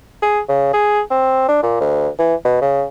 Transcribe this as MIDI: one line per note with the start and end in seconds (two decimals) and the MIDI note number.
0.22 0.40 68
0.49 0.69 49
0.74 1.01 68
1.11 1.47 60
1.48 1.62 62
1.63 1.78 46
1.80 2.08 38
2.19 2.35 52
2.45 2.61 47
2.62 2.84 49